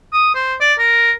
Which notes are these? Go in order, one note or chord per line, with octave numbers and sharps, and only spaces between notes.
D#6
C5
D5
A#4